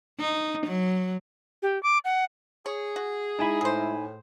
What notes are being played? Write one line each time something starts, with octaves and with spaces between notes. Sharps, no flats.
D#4
F#3
G4
D6
F#5
G#4 C#5
F#4
G#3 D#4 E4 G#5 B5
A2 G#4 C5